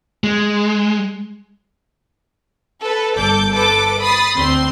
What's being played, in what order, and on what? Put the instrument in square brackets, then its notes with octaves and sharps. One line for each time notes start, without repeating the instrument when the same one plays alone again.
[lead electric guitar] G#3
[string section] A4 B4
G1 A4 D6 G6
A4 B4 D6
B5 D#6 A6 C7
D2 C4 C6